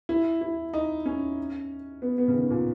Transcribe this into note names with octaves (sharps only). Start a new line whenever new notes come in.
E4
E4
D#4
C#4
B3
B3
C#3
D#3
A#2